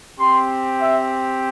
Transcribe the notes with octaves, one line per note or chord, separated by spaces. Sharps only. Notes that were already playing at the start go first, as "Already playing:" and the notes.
C4 G4 C6
E5